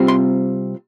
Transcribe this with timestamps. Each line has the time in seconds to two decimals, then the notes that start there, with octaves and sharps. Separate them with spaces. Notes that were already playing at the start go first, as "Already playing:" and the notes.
Already playing: C3 G3 C4 F4
0.08 C6